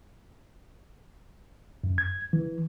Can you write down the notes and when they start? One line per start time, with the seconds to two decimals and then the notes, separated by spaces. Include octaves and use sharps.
1.84 F#2
1.98 G#6
2.33 E3